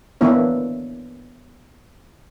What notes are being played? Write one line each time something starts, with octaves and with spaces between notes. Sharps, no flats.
E3 A#3 B3 D4 E4 C#5